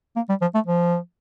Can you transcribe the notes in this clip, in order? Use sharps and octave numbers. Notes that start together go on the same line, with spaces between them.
A#3
G3
F3
A3
F3